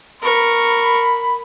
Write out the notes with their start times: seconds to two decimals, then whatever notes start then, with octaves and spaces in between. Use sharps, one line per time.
0.22 A#4 B5 C#6